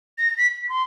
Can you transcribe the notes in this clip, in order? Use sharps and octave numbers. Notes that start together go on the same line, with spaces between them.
A#6
B6
B6
C6